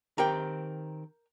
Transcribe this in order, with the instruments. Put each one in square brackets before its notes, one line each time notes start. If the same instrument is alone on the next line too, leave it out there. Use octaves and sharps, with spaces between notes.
[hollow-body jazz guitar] D#3 C4 G4 [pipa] A#4 G5